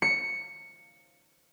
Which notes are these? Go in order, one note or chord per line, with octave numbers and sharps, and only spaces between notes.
C#7